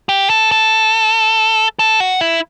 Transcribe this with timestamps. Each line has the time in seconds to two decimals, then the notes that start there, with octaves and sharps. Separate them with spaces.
0.09 G4
0.30 A4
0.52 A4
1.79 A4
2.00 F#4
2.21 E4